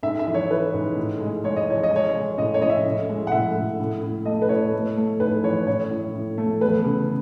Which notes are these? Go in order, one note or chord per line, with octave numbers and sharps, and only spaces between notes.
G#2 E5
E5
E3
C#5
E3 B4
G#2
A2
G#3
G#3 C#5
D#5
E3 C#5
D#5
G#3 C#5
G#3
A2 D#5
C#5
A2 D#5
E5
A2
G#3
F#5
A2 E5
A2
A2
A2
A3 D#5
B4
A2 C#5
A3
A3
G#2 B4
E3 C#5
A2 C#5
A2
A2
A3
E2 B4
C#3